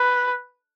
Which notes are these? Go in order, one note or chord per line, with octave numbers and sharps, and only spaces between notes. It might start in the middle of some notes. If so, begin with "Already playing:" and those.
Already playing: B4